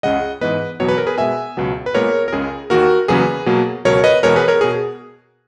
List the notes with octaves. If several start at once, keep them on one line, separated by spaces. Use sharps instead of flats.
C#2 C#3 G#3 D#5 F#5
G#2 E3 B3 B4 D#5
E2 B2 F#3 B3 C#5
B4
A#4
G#4 B4
B2 G#3 B3 E5 G#5
C#2 B2 F#3 B3
B4
A#2 G#3 B3 A#4 C#5
A#4
C#2 C#3 G#3 G#4
D#2 D#3 A#3 F#4 A#4
E2 C#3 F#3 A#3 G#4 B4
B2 F#3 A#3
C#2 B2 F#3 A#4 C#5
B4 D#5
E2 B2 G#3 B3 A#4 C#5
G#4 B4
A#4 C#5
B2 G#4